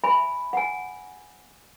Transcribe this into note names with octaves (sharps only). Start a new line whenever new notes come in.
E5 G#5 B5
F#5 G#5